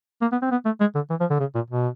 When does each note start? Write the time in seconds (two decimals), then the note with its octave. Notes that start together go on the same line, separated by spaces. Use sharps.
0.21 A#3
0.32 B3
0.42 C4
0.51 B3
0.65 A3
0.80 G#3
0.95 D3
1.10 E3
1.20 F3
1.30 D3
1.40 C#3
1.55 A#2
1.70 B2